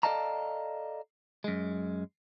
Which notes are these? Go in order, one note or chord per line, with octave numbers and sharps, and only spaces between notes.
A4 D5 D#5 F5 A5 A#5
F#2 G#3